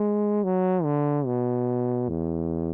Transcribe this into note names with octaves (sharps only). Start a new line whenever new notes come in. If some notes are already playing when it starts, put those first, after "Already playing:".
Already playing: G#3
F#3
D3
B2
E2